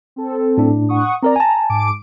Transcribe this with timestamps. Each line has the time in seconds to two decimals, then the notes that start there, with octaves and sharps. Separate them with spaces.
0.16 C4 A4
0.57 A2 D4
0.89 F#5 C#6 D#6
1.23 C4 A#4 D5 A#5
1.36 G#5 A5
1.69 G#2 D6 D7